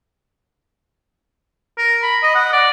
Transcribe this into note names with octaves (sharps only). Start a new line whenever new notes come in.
A#4
B5
D#5
F#5
D5